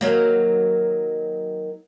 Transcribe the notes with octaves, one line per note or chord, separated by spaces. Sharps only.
D#3 F#3 A#3